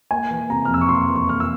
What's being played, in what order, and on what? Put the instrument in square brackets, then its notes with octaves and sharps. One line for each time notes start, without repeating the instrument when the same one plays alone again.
[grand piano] A#3 G#5
E3
C3 A#5
F6
F2 E6
C#6
A#3 C6
E3
C#6
A#3 F6
E6